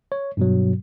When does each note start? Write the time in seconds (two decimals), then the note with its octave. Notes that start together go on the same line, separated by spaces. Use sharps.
0.12 C#5
0.37 G2 B2 F#3